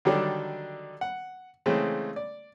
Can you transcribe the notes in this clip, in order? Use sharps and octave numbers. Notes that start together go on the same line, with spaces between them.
D3 D#3 F#3 G3 D4 A4
F#5
C#3 E3 G#3 A3 C4
D5